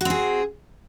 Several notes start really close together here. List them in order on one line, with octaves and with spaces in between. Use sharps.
F#4 C4 G#4